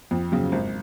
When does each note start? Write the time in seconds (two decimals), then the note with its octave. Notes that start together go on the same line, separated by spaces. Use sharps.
0.11 F2
0.32 C#3 F#3
0.52 G#1